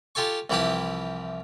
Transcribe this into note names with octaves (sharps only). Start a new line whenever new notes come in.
F4 G4 A4 G#5 C#6
C2 E3 F3 E4 G4 D#6